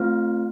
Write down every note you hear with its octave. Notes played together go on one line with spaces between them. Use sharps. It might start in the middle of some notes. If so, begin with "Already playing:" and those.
Already playing: A3 C4 F4 C5